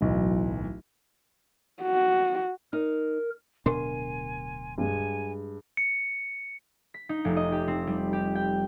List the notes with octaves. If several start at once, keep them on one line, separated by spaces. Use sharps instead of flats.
D1 B1 E3
F#4
D#4 A#4
D1 B2 D4 A#4 G#5 C6
G2 G#3 G#5
C#7
B6
D#4
F1
D#5
G4
C4
G3
G4
G5